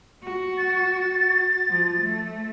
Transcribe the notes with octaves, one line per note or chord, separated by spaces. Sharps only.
F#4
A6
F3
A3